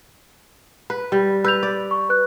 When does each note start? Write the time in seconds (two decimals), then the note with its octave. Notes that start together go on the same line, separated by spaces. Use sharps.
0.90 B4
1.12 G3
1.44 B4 E6 G6 F7
1.63 D5
1.91 C#6
2.09 B4 F#6